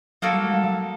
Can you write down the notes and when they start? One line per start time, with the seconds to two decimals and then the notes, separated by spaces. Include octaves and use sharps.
0.22 F#3 A#3 D#4 F#4 A4
0.33 G3
0.44 G#3
0.54 G3
0.64 F#3